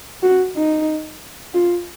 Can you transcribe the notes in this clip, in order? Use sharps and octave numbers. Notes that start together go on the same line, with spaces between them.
F#4
D#4
F4